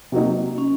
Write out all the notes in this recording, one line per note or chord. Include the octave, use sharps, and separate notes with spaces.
C3 F#3 A#3 D#4
C#4